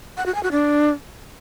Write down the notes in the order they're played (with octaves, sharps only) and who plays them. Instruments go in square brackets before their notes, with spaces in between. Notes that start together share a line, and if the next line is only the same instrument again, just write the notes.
[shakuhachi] F#5
F#4
G#5
F#4
D4